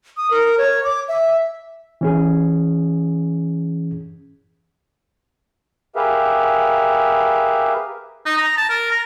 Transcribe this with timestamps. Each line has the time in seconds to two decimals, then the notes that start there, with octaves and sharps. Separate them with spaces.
0.17 D#6
0.31 A#4
0.58 C#5
0.84 D6
1.08 E5
2.01 E3 C#4 G#4
5.96 G4 G#4 A#4 B4 E5 F5
8.26 D#4
8.38 A#5
8.57 A5
8.69 A#4
8.91 A#5